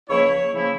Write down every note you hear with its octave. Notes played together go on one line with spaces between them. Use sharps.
C#2 C#3 F3 A#3 E4 C#5
C#3 F3 A#3 E4